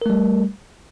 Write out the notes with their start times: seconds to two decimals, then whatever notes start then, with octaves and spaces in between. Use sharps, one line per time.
0.02 A#4
0.06 A3
0.10 G3